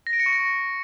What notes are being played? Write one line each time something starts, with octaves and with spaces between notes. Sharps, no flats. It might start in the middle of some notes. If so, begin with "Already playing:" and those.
A#6
D7
C#7
C#6
A#6